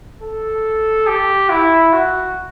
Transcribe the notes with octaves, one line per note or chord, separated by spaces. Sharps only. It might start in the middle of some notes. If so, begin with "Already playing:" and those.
A4
G4
E4
F#4